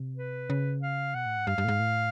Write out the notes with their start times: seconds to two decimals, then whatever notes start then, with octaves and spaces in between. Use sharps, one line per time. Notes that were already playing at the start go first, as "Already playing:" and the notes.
Already playing: C3
0.17 B4
0.50 C#3
0.83 F5
1.15 B2 F#5
1.26 A2
1.37 G#2
1.47 G2 F5
1.58 G2
1.64 A2
1.68 G#2
1.80 A2